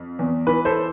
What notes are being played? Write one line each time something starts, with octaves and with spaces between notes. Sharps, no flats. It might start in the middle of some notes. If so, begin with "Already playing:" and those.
Already playing: F2
E2
E3 B4
A4 C5